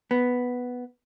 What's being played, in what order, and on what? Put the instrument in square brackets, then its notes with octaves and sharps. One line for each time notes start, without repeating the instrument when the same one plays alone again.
[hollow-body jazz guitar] B3